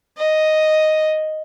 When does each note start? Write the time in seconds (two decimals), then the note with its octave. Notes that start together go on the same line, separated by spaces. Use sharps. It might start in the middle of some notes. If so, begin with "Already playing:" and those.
0.17 D#5